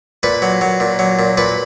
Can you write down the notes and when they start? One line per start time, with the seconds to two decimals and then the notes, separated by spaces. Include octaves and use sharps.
0.23 A#2 B4
0.42 F#3
0.61 F#3
0.80 A#2
0.99 F#3
1.19 A#2
1.37 A#2 B4